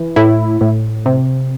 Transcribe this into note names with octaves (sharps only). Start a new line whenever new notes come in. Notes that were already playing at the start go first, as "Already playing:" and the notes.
Already playing: E3
A2 E4
A2
C3